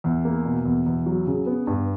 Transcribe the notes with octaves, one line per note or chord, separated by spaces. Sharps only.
E2
A#3
B2
E2
E2
F#3
C#3
B3
G2